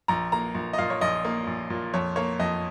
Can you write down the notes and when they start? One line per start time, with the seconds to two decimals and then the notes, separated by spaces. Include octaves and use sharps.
0.08 A#1 A#5
0.32 A#3 A#5
0.54 A#1
0.73 D#5
0.78 A#2 F5
0.90 C#5
1.01 A#1 D#5
1.25 A#3
1.47 A#1
1.70 A#2
1.94 F2 C#5
2.16 A#3 C#5
2.40 F2 D#5